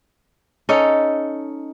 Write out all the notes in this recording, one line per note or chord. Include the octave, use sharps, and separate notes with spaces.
C#4 D#4 A4